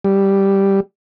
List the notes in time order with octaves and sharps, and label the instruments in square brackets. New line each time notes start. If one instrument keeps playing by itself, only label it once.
[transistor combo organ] G3